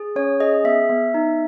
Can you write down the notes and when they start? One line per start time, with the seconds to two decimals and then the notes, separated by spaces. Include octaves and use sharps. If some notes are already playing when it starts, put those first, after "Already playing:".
Already playing: G#4
0.16 C#4 C#5
0.40 G#4 D#5
0.64 B3 E5
0.89 B3
1.14 D#4